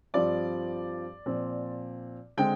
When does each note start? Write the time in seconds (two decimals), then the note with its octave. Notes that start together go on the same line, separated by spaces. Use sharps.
0.14 G2 F3 C4 D5
1.26 A#2 F3 C4
2.37 D3 G#3 C4 G5